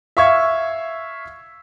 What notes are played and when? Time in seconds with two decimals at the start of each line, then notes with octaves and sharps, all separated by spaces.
0.17 E5 F5 C#6 E6 G#6